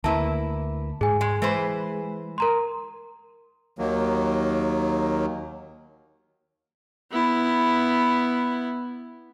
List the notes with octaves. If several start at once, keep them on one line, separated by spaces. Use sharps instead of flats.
D2 A#3 E4 B4 A5
G#2 G#4 G#5
G#3
E3 G#3 B4 C5
A#4 A#5 C6
D#2 D#3 F#3 A#3
B3 E4